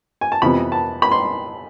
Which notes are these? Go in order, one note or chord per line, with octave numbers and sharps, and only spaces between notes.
G#5
A5
F2 C3 E3 B3 B5
A5
B5
C6